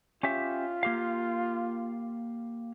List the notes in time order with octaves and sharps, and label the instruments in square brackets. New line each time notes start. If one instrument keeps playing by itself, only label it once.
[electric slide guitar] C#4 G4 E5 [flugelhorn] F4
[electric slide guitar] A#3 G4 F5